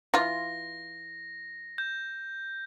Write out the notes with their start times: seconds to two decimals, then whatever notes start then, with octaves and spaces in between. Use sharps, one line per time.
0.14 E3 F4 A#6
1.78 G6